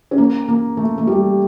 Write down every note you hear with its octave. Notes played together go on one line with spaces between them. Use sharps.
C#4
A#3
A#3
A3
A3
G3